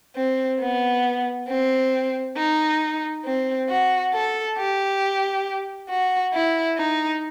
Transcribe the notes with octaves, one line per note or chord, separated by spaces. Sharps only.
C4
B3
C4
D#4
C4
F#4
A4
G4
F#4
E4
D#4